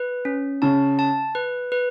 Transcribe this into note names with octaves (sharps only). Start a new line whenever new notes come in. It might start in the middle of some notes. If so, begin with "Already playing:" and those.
Already playing: B4
C#4
C#3 A5
A5
B4
B4